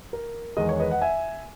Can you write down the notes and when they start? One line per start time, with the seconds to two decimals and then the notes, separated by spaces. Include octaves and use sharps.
0.13 A#4
0.57 E2 D#3 G#3 D#5
0.69 C#5
0.80 B4 D#5
0.91 F#5
1.02 E5 G#5